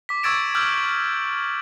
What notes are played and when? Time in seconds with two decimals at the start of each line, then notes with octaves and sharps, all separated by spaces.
0.09 D6 B6
0.23 C#6 E6 G#6 A6 D7 E7
0.55 D6 E6 F6 G6 F#7